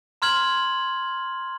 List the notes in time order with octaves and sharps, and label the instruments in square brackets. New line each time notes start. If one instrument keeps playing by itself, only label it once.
[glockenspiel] A#5 C6 F6 G#6 F#7